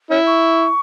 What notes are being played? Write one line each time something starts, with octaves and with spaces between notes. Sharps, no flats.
C#4 E4
C#6